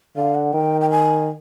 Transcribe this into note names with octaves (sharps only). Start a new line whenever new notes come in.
D3 F5
F#5
D#3 G5
G5
G#5